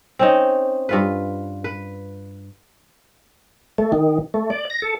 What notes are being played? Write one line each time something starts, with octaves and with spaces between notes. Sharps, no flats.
C4 C#4 D#4
G2 F4 B4
B4
A3
D#3
A3
D5
A#6
A4